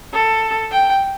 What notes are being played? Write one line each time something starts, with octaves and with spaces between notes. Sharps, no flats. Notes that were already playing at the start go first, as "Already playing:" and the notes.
A4
G5